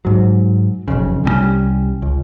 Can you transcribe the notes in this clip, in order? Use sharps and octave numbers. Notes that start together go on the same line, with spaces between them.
G#2 F#3
F#1 B1 F2 C#3
C2 G3 G#3 C#4
C#2